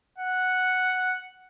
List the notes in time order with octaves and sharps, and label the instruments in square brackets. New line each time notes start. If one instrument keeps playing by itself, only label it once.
[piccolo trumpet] F#5